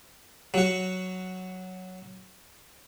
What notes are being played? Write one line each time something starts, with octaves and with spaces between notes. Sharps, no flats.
F#3 F#4